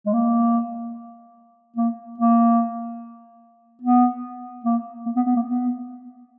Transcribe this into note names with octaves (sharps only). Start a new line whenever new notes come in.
G#3
A#3
A#3
A#3
B3
A#3
A#3
B3
B3
A#3
B3